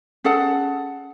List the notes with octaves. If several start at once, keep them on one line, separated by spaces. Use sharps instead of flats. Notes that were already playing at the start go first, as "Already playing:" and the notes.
C#4 G#4 A4 F#5